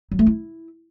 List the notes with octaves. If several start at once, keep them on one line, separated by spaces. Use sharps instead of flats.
F#3
A3
E4